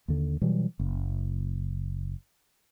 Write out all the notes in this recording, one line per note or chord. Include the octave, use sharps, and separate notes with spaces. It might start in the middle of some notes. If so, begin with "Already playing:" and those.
D#2 D3
B2 E3 F#3 G3
F#1